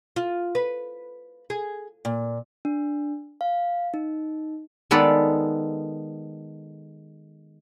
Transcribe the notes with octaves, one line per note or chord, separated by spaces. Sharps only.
F4
B4
G#4
A#2
D4
F5
D#4
D#3 G#3 B3 A4 B4 D5